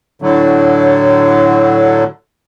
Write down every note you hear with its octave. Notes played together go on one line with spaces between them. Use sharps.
A2 D3 F#3